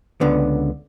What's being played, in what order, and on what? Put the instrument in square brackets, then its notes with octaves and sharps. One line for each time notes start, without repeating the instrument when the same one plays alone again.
[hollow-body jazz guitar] C#2 D3 B3